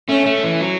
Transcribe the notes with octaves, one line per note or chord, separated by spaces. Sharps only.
A3 C#4
A3
E3
F#3